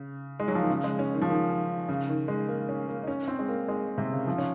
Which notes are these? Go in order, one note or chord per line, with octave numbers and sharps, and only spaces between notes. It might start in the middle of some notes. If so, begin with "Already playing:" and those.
Already playing: C#3
G#3
F#3
F3
D#3
C#3
G#3
C#4
D#3
F3
D#3
C#3
D#3
G#3
A#3
C#4
A#3
D#4
C#4
C4
G#3
A#3
G#3
C3
C#3
F3
C#4